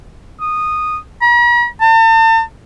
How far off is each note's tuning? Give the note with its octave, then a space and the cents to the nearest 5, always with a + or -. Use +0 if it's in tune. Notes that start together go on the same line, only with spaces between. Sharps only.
D#6 -10
A#5 +45
A5 +40